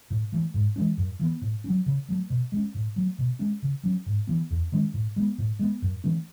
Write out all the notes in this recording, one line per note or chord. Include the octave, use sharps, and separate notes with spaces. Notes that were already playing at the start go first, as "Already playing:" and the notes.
A2
E3 A3
G#2
E3 G#3 C#4
F#2
E3 B3
A2
F#3 C#4
C#3
F#3 A3
B2
G#3 C#4
A2
F#3 A3
B2
G#3 C#4
C#3
F#3 C#4
G#2
E3 B3
E2
D#3 G#3 C#4
A2
G#3 B3
A2
G#3 B3
F#2
E3 A3 C#4